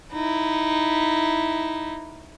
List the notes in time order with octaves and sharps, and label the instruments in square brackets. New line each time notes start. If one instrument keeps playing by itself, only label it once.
[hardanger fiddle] D#4 E4